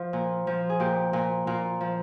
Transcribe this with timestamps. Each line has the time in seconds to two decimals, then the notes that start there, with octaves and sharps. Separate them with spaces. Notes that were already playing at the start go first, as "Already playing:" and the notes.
Already playing: F3
0.13 A#2
0.47 F3
0.69 G#4
0.80 A#2 G4
1.13 A#2
1.47 A#2 F4
1.81 F3